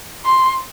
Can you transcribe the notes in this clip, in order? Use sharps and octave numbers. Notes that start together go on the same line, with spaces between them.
C6